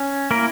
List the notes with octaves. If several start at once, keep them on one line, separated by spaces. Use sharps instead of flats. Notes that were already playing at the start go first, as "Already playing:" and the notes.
Already playing: C#4
A#3 E4 A#4